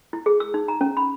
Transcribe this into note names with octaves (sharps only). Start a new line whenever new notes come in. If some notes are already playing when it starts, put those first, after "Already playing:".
E4
G#4
E6
D#4
A#5
C#4
B5